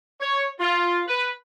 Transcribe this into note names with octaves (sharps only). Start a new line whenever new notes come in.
C#5
F4
B4